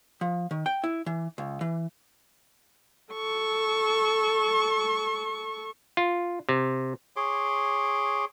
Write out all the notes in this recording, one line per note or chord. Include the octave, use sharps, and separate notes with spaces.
F3
D#3
G5
E4
E3
C#2
E3
A4 C#6
F4
C3
G#4 C#5 C6 D6